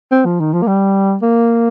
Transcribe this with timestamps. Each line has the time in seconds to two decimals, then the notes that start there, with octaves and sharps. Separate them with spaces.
0.12 C4
0.26 F3
0.40 D#3
0.53 F3
0.62 A#3
0.67 G3
1.23 A#3